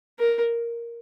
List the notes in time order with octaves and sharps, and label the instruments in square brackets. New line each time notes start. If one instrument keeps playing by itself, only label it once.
[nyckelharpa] A#4